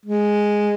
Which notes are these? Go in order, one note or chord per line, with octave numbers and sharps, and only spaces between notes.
G#3